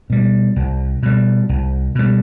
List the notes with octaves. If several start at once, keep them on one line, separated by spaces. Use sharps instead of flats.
B2 G3
C2
B2 G3
C2
B2 G3